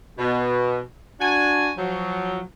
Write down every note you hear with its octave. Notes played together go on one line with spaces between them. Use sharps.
B2
D4 F#4 G#5
F3 F#3